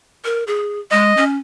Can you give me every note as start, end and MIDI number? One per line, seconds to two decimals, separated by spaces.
0.25 0.44 70
0.47 0.79 68
0.91 1.13 56
0.91 1.24 75
1.17 1.37 61